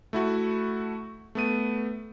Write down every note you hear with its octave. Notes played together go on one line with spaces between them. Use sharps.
A3 E4 F#4
A3 B3 D#7